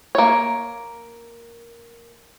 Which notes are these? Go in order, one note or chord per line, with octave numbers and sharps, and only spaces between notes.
A#3 C#5